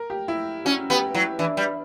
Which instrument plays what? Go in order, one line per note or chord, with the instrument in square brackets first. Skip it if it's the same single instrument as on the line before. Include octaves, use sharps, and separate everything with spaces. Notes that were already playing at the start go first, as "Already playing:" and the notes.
Already playing: [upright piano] A#4
G4
E4
[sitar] C#4 [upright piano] F#4
[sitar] B3 [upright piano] G4
[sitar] F#3 [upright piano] E4
[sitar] E3 [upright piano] D4
[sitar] G3